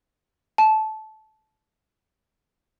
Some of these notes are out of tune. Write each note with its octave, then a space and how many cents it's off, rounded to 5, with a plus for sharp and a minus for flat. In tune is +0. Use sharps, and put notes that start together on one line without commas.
A5 -15